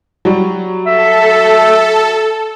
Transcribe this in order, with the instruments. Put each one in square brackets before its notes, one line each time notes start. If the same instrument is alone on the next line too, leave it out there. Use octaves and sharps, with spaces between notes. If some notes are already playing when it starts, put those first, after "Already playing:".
[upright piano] F#3 G3
[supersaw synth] A4 [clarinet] E5